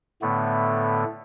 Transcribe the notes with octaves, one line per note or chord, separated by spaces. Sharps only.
A2 D3 A3 B3